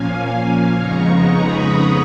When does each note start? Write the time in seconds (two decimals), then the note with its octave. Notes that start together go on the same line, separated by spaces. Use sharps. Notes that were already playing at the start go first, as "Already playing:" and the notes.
Already playing: A#2 F3 A#3 C#4 F5 G#5
0.76 F2 C#3 G#3 B3 D#4 A#5 C#6
1.05 A#5 C#6
1.34 B5 D#6